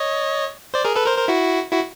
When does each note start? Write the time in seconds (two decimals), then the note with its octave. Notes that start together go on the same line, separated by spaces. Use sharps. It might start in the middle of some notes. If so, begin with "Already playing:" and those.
Already playing: C#5 D#5
0.74 C5 D5
0.85 G#4 A#4
0.96 A4 B4
1.06 A#4 C5
1.18 A#4 C5
1.28 E4 F#4
1.72 E4 F#4